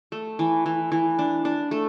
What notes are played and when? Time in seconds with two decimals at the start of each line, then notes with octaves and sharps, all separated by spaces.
0.12 A3
0.39 E3
0.66 E3
0.92 E3
1.19 D4
1.45 D4
1.71 A3